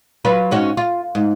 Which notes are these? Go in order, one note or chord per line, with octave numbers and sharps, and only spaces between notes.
F#3 F4 B4
G#2 C#4 F#4
F4
G#2